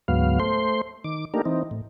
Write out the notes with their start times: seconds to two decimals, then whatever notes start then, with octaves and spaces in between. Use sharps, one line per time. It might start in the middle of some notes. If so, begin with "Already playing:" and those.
0.08 D2 G#2 F#3 B3 F5
0.40 A3 C5 C6
1.04 D#3 D6
1.34 A3 A#3 D4 D#4 G4 A#4
1.45 E3 C4 D#4
1.71 A2